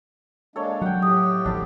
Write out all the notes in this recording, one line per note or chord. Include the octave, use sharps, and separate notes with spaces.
G#3 A#3 D4 A4 C#5
F#3 F#5 G5
A2 G4 D#6
G#1 F3 D4 E4 A4